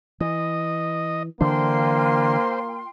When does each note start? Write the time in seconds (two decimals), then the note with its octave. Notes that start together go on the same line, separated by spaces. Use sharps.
0.21 E3 D#5
1.41 D3 E3 A#3 D4 F4 C5 G5 C6